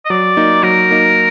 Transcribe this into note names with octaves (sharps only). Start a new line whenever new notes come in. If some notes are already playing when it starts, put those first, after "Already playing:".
D#5
F#3 D5
A#3 D#4
F#3 A#4
A#3 D#4